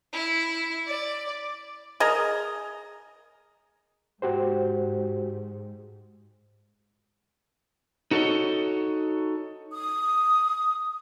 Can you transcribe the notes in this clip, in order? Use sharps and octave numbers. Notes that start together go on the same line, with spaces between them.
E4
D5
G#4 A#4 D#5 A#5
G#2 F#4 G4 C5
D#4 F#4 A4 B4 C#5 D#5
D#6